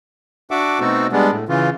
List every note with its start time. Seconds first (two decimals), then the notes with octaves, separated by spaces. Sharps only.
0.51 D4 F#4 E5 F#5 D6
0.80 B2 A3 C4 D#4 F#4 A4
1.12 G3 G#3 B3 D4
1.32 A2
1.49 C#3 E3 F4